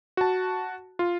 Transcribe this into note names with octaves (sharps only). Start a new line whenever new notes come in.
F#4 A5
F4